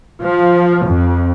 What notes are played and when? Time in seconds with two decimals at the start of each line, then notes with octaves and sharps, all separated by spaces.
0.22 F3
0.87 F2